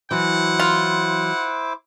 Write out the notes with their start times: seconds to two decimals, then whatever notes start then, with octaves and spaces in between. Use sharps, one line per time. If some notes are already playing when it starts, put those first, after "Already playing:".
0.11 E3 F#3 E4 C5 F#5 D6
0.59 F4